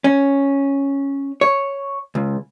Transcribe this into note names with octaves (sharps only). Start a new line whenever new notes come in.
C#4
C#5
C#2